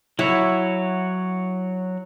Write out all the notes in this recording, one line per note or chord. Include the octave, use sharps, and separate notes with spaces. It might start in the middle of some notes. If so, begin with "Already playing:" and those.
F#3 E4 F#4 C#5